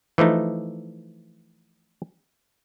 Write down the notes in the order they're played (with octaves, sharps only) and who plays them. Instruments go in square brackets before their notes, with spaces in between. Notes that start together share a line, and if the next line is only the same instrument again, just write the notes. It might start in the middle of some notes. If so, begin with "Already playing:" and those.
[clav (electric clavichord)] E3 F3 A3 D#4